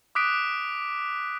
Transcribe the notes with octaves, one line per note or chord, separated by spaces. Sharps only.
D6 D#6 F#6 B6 D7